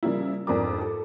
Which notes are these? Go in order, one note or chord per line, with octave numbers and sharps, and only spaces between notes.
C#3 F3 G3 A#3 E4
F2 G#2 D4 A#4 D6
A4